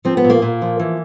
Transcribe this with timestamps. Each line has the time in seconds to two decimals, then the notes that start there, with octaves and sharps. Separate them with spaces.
0.05 F3 C4
0.17 B3
0.24 A#2
0.30 A#3
0.42 A#2
0.62 F3
0.80 E3